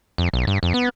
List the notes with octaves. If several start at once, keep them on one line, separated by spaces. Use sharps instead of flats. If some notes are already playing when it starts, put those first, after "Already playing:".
F2
B1
G2
F2
B3